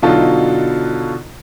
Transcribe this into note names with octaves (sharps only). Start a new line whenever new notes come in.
B2 D3 F#3 D#4 F4 A4